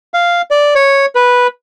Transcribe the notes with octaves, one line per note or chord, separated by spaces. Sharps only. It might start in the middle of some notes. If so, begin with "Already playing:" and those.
F5
D5
C#5
B4